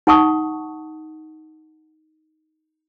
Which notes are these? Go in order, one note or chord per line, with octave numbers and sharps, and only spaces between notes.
D#4 F#5 A5 C#6 D#6